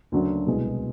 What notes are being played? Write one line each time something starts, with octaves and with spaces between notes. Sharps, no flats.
D2 C#3 F#3 A#3 D4
C2 B2 G#3 B3 E4